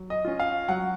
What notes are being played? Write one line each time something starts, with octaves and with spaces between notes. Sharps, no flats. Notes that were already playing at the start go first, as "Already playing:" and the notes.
Already playing: F#3
D#5
C#4 F4
F5
F#3 F#5